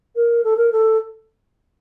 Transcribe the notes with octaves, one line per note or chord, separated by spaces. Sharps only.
A#4
A4
A#4
A4